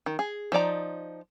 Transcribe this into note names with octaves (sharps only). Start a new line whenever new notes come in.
D#3
G#4
F3 D#4 D5 A#5